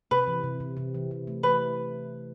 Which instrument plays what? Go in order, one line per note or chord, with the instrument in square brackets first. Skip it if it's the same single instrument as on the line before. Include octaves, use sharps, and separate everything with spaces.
[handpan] C3 [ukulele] B4
[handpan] E3
C3
C3
C3
E3
C3
A3
[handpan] E3 [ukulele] B4